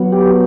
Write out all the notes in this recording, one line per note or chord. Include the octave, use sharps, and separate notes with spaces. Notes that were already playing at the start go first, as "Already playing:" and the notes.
Already playing: F#3 B3
G4